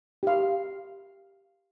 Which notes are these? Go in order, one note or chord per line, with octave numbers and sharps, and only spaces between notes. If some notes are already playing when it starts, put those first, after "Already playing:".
G4 F5